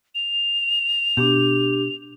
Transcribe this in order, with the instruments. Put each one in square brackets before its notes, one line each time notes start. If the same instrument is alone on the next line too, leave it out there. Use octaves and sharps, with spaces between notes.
[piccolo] F7
[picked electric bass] B2 [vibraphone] D4 G4